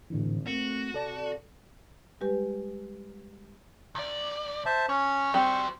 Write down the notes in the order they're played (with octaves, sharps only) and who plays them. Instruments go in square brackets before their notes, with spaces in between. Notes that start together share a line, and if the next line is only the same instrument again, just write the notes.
[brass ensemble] G#1 [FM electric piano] A2 D3 E3
[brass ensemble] A3 C4 [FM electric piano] A#3 [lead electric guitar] F#4
[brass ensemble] C3 [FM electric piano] A4 D5 A5
[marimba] G3 G#3 G4 B4
[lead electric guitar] C2 D5
[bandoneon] C5 E5 A5
[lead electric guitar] G2 C#5 [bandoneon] C#4
[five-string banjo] G3 C4 G4 [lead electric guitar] F#4 C5 [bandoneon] C#6